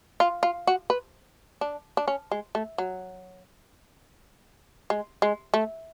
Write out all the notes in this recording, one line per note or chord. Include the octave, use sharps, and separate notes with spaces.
F4
F4
F#4
B4
D4
D4
C#4
G#3
A3
F#3
G#3
G#3
A3